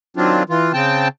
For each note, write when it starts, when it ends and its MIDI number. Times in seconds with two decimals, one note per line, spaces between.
0.17 0.43 51
0.17 0.43 54
0.17 0.43 60
0.17 0.43 62
0.17 0.43 65
0.50 0.72 52
0.50 0.72 65
0.73 1.08 49
0.73 1.08 60
0.73 1.08 79
0.73 1.08 81